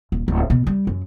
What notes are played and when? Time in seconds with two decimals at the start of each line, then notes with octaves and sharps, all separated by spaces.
0.12 D#1
0.28 D1
0.50 B2
0.67 G3
0.87 F#2